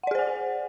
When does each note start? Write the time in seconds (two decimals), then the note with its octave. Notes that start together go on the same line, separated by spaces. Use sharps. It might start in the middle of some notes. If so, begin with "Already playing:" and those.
0.03 F#5
0.07 D5
0.11 G#4
0.15 C5
0.19 G#5